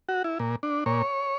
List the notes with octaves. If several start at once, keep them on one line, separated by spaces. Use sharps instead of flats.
F#4
E4
A#2
D4
A#2 C#5